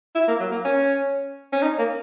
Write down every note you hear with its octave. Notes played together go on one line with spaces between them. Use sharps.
E4
A#3
F#3
A#3
C#4
C#4
D#4
A#3